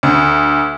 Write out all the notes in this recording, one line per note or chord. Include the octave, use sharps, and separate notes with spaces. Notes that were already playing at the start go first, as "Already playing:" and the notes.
D2